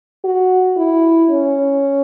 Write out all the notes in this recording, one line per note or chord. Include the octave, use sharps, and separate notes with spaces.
F#4
E4
C#4